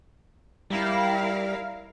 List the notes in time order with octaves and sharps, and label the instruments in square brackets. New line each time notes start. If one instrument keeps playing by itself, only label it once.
[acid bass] G3 [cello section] E4 A#4 F5